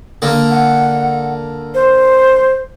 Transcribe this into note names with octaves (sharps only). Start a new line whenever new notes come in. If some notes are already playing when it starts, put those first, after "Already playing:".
D3 A#3
F#5
C5